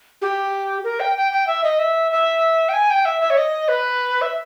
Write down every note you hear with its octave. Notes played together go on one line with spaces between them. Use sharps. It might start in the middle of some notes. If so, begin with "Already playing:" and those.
G4
A#4
G5
G5
G5
E5
D#5
E5
E5
G5
G#5
G5
E5
E5
C#5
D#5
B4
E5